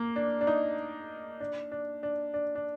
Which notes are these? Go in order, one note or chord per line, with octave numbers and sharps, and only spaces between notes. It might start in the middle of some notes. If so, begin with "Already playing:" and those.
Already playing: A#3
D4
D4
D#4
D4
D4
D4
D4
D4